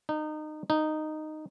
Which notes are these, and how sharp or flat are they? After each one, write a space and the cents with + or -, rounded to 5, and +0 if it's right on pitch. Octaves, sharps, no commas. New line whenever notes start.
D#4 -25
D#4 -10